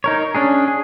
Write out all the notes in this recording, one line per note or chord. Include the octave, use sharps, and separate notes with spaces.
D#4 A#4 C#5
C#4 D4 G#4
G#4